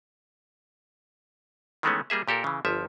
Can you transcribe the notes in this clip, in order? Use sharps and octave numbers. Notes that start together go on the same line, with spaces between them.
D#3 E3 G#3 A3 B3 C#4
G3 A#3 G#4 E5
A#2 G4 A4 A#4
C#3 E3
G1 F3 E5